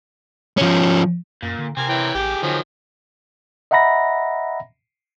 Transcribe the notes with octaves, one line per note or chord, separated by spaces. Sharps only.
F3 C#4
F#2 A#2
D3
C3 C4 A#4 G#5
E3 C#5 G5
A1 G4 G#4 G5
D3 D#3 F3 F#3
D#5 E5 F#5 A#5 B5 A#6